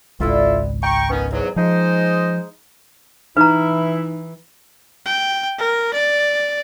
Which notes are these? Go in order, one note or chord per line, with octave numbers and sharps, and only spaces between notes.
G#1 C#2 F#3 G3 B3 E4 F4 A4
F4 G5 A#5 C#6
D#3 B3 C#4
E2 G#2 D#3 F#3
F3 G#3 D#4 C5
E3 D#4 E4 B4 A#5
G5
A#4
D5